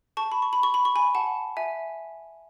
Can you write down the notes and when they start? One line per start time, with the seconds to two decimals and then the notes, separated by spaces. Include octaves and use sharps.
0.17 A5 C#6
0.32 B5
0.42 C#6
0.53 B5
0.63 C#6
0.74 B5
0.85 C#6
0.96 G#5 B5
1.15 F#5 A5
1.57 E5 G#5